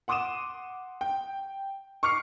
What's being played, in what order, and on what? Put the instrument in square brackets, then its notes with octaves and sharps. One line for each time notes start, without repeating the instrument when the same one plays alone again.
[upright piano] F#5 C6 D6 D#6 D#7 E7
G5
C#6 D6 F6 C7 C#7